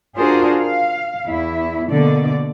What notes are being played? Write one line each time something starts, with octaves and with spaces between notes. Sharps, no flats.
D4 F4 F#4 G#4 A#4 C5
F5
E2 E4
B2 D3 A#3 D5